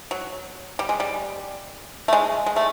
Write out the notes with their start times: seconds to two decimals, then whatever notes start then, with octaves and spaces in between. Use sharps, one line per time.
0.11 F#3
0.79 G3
0.89 G#3
1.00 G3
2.08 A3
2.13 G#3
2.46 G#3
2.56 A3